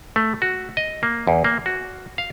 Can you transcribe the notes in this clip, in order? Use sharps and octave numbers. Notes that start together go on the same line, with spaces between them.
A3
F#4
D#5
A#3
E2
A#3
F#4
F5